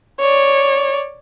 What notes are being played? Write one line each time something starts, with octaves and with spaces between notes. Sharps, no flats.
C#5 D5